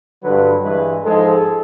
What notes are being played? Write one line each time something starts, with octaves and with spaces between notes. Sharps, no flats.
G2 D3 F#3 B4
G2 E3 G#3 B4
G#2 F3 G#3 A4